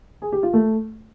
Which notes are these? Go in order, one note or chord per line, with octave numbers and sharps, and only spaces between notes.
G#4
G4
F4
A3